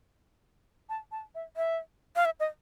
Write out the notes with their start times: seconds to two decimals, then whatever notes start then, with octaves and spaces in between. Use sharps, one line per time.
0.89 A5
1.12 A5
1.35 E5
1.57 E5
2.16 F5
2.25 E5
2.40 D#5